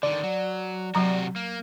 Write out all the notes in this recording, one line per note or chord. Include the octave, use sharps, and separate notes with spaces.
D3 D#3 D5
F#3
C3 F#3 F#4 A#5
A#3